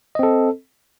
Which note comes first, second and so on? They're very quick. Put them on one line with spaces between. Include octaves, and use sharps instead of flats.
D#5 C4 A4